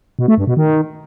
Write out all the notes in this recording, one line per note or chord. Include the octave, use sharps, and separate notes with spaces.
B2
A3
G2
B2
D#3